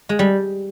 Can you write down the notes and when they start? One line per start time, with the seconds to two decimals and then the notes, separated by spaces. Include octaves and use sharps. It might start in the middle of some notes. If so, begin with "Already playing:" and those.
0.09 G#3
0.19 G3